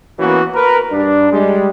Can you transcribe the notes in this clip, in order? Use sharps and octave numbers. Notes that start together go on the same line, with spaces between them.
E3 A#3 B3 C#4 F#4
A#4 B4
G2 D4
G3 G#3